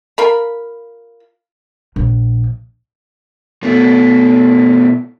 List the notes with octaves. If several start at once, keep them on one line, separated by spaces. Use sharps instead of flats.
F4 A#4 B5
A#1
B2 A3